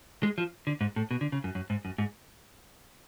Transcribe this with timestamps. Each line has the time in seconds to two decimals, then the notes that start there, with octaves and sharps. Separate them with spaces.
0.23 G#3
0.38 F3
0.67 D3
0.81 G#2
0.96 A2
1.11 B2
1.21 D3
1.32 C#3
1.44 F#2
1.55 F#2
1.70 G#2
1.85 F#2
1.98 G#2